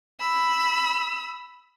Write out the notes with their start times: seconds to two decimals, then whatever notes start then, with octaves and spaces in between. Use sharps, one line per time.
0.20 B5 E6